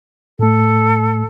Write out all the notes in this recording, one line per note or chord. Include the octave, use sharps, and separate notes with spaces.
A2 A3 A4